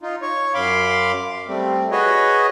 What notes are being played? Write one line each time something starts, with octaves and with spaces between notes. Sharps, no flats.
D#4 F4
C#5 C#6
F#2 F5 B5 C6 D6
G3 A3 C4
F#4 G#4 B4 C#5 D#5